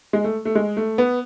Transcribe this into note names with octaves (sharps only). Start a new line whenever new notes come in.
G#3
A3
A3
G#3
A3
B3